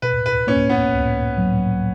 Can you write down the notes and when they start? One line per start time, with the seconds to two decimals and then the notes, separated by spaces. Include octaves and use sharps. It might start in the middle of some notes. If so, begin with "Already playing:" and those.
0.02 B2 B4
0.26 B4
0.47 A#3 C#4
0.70 B3
0.92 C#2
1.38 F#3